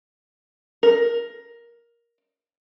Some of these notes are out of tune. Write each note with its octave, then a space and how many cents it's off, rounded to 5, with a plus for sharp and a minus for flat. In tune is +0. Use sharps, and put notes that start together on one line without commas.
A#4 +10